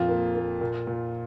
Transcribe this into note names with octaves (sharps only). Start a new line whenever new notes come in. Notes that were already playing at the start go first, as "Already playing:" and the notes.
Already playing: F2 A#2 F4
A#3
A#3
A#2
A#2